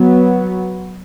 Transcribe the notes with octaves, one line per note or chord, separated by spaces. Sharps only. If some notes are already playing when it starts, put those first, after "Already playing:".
Already playing: F#3 B3